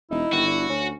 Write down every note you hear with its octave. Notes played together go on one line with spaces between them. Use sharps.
E1 D#4 E4
G1 D#3 F#4
D3
D2 C#4